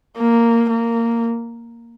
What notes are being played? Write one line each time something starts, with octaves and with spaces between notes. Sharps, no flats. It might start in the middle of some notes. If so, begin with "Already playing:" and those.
A#3
A#3